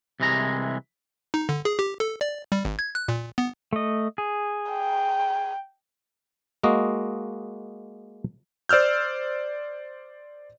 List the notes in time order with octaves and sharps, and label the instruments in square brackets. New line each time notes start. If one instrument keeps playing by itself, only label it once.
[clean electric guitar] C2 C3 E3 G#3 A#5
[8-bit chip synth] D#4
D3
G#4
G4
A4
D5
G3
G#1
G#6
F#6
A#2
B3
[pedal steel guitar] A3 D#5
G#4
[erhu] G5
[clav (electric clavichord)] G#3 A#3 F#4 D#5
[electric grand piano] C5 D5 E6 F6 G6